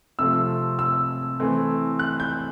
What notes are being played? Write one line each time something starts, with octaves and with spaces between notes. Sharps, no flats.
C3 F3 A3 C4 E6
E6
E3 A3 C4
F#6
G6